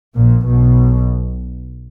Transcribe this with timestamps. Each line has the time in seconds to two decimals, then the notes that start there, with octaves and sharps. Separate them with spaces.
0.17 A#1 A#2
0.47 B1 B2